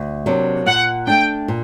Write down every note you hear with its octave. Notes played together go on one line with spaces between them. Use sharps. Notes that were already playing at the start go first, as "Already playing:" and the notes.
Already playing: D2
C3 F#3 A#3 D4
A#2 F#5
A3 D4 G5
A#2